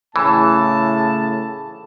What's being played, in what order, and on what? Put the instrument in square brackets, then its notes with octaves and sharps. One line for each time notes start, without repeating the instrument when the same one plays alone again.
[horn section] A2 C#3 A5 [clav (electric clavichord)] E3